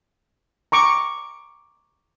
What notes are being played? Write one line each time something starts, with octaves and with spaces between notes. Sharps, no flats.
A#5 C#6 D6